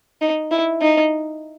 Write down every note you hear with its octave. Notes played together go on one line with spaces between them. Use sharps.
D#4
E4
D#4